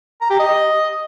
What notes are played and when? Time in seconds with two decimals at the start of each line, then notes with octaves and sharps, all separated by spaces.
0.21 A#5
0.30 G4
0.40 D#5